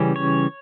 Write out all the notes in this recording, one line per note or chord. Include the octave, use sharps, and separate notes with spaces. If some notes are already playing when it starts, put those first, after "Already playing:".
Already playing: C#3 E3 G3 C#4
C#5